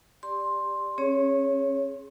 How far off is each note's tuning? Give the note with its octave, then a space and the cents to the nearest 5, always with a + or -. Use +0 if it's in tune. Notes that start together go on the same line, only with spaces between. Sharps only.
G4 +10 D5 +0 C6 +10
C#4 -30 G#4 +0 C#5 +0